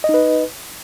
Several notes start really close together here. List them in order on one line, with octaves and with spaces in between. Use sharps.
D#5 D#4 B4